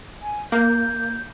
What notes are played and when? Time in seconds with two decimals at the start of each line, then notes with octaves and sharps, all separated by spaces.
0.22 G#5
0.52 A#3 G6